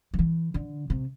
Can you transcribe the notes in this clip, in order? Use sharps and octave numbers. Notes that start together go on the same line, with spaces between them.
F3
E3
D3
C3